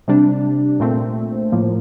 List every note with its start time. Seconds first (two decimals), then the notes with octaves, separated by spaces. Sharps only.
0.08 C3 G3 D4
0.80 A#2 A3 C4
1.52 A2 F3 A#3